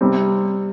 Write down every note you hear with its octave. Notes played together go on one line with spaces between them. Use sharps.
C3 G3 C4